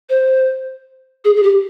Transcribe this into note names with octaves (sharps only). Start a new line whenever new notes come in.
C5
G#4
G#4
G4